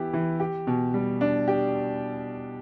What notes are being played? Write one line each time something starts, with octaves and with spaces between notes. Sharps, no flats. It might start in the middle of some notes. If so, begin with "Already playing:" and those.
Already playing: E3 B3 E4 G4
E3
G4
B2
G3
D4
G4